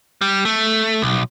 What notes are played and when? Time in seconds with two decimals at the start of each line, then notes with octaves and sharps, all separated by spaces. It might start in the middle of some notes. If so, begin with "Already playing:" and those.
0.21 G3
0.45 A3
1.02 B1